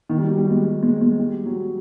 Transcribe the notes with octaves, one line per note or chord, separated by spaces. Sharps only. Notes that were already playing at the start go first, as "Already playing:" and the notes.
D#3
G3
F#3
G3
G#3
G3
G#3
G#3
G3
F#3